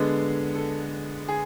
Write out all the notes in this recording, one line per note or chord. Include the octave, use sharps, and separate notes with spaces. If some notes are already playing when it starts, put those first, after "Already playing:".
Already playing: D3 G#3 B3
A4
G#4